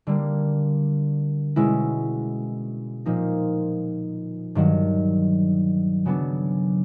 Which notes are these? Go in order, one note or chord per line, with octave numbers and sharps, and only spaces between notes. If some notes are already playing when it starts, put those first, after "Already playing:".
D3 G3 A#3
B2 G#3 C#4 E4
A#2 F3 A#3 D#4
G2 D#3 F#3
C#3 F#3 B3 D4